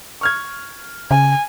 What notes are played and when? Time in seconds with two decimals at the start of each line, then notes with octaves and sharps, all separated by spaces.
0.21 C#6 F6 G#6
1.11 C#3 G#5